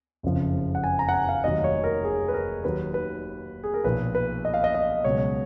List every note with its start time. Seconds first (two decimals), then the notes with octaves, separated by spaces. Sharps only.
0.23 F#1 F2 C#3 F3
0.75 F#5
0.84 G#5
0.99 A#5
1.09 F#5
1.14 G#5
1.29 F5
1.44 F1 D#2 D#3 F#3 D#5
1.64 C#5
1.84 A#4
2.04 G#4
2.28 B4
2.34 A#4
2.64 D#2 D#3 F#3 B4
2.94 B4
3.64 G#4
3.74 A#4
3.84 B1 A#2 F3 B4
4.15 B4
4.45 D#5
4.54 F5
4.64 D#5
4.74 D#5
5.04 C#2 B2 F#3 C#5